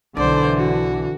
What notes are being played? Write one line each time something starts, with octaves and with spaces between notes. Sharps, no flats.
B1 B2 D3 E3 C5 D5
F#4